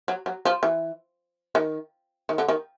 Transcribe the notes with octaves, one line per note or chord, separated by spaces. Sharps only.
F#3
F#3
F3
E3
D#3
D#3
D3
D#3